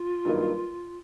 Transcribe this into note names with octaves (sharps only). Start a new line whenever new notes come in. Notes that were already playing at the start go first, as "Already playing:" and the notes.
Already playing: F4
G2 D#3 F#3 A#3 D#4